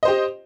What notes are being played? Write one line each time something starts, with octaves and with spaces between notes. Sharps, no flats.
G4 C5 D#5